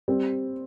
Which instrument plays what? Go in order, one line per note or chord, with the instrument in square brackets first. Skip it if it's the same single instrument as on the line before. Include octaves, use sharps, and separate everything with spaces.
[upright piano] G3 C4